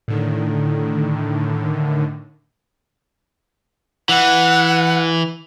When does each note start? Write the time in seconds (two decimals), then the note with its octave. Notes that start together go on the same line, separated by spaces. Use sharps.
0.08 A2 D3 D#3
4.09 E3 F#5